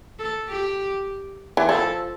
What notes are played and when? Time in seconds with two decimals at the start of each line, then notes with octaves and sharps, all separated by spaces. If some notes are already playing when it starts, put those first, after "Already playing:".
0.19 A4
0.49 G4
1.57 E3
1.69 F3 A4